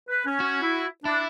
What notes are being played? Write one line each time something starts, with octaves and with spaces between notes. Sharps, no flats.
B4
C#4
C#4 F#4
E4
D4 E4